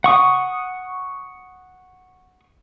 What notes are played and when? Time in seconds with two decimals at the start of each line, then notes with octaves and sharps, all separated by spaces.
0.04 F#5 C#6 D#6